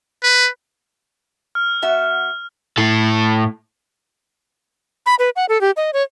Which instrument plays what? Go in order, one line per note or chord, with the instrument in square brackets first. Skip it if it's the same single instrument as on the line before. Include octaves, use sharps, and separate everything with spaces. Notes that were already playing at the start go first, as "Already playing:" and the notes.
[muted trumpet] B4
[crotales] F6
[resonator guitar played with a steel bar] B3 F#4 E5
[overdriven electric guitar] A2 A4
[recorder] B5
B4
F#5
A4
G4
D#5
C#5